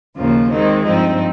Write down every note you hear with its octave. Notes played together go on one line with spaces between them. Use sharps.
D#2 C#3 F3 A#3 F4
D#3 G#3 C4 D#4
G2 F3 C4 D#4